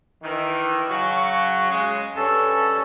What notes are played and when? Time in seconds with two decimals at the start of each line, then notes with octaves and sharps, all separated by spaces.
0.23 D#3 E3
0.89 C#3 F#3 C#6
1.71 C#3 G#3
2.16 G2 C#4 A4 A5